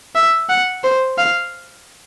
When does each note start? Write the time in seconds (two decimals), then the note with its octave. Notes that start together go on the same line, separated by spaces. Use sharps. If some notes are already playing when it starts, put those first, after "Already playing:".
0.15 E5
0.49 F#5
0.84 C5
1.18 F5